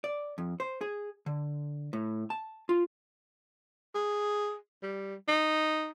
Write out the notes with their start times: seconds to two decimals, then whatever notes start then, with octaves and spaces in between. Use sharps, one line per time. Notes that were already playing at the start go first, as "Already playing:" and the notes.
0.04 D5
0.38 F2
0.60 C5
0.81 G#4
1.26 D3
1.93 A2
2.30 A5
2.69 F4
3.94 G#4
4.83 G3
5.28 D#4